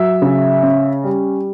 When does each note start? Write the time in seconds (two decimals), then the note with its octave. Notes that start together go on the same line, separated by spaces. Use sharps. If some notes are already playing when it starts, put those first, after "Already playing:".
Already playing: F#3 E5
0.22 C#3
0.63 C#4
1.04 G3